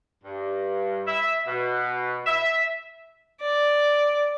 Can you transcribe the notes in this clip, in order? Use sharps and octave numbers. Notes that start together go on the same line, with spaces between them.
G2
E5
B2
E5
D5